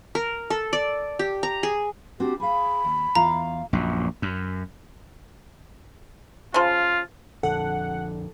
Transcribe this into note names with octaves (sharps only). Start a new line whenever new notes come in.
A#4
A4
D5
G4
A#5
G#4
C4 D4 F#4 G4
G#4 F5 B5
D#2
E2 F4 F5 A#5
A#1 F#2
F#2
C#3 F3 F4
A#1 F2 D3 A4 F#5